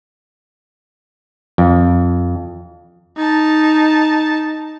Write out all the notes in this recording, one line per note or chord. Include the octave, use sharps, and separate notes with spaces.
F2
D#4 A5